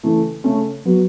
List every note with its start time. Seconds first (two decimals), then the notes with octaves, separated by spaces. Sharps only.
0.03 C#3 E3 A3
0.44 C#3 A3 C#4 A4
0.85 F#3 B3 F#4